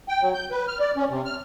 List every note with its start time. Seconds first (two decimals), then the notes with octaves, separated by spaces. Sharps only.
0.09 G5
0.22 F#3
0.34 G6
0.51 B4
0.67 F6
0.79 D5
0.97 C#4
1.09 C3
1.25 F6